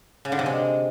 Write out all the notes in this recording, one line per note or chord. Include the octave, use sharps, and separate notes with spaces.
C#3
D3
C3
G#3